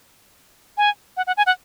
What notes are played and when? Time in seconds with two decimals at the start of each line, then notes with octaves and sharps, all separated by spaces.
0.78 G#5
1.17 F#5
1.27 F#5
1.37 G#5
1.46 F#5